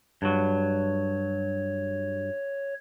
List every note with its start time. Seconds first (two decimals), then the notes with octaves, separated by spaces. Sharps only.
0.22 G2 F#3 C#5